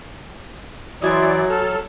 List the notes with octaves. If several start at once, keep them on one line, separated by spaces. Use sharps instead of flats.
E3 F#3 E4 F#4 D5 D#5 G#5 C6
A4 A5 F6